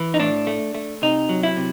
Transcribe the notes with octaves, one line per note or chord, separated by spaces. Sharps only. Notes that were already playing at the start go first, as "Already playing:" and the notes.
Already playing: E3
D#4
A2 D4
A3
A3
C3 D#4
F#3
E4
C3